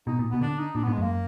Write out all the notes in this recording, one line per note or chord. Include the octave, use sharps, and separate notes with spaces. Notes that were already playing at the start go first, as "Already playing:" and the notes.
B2 D#4
A#2
B2 B3
D3 D4
D#4
A#2 D4
G#2 B3
G#3
F#2 A#3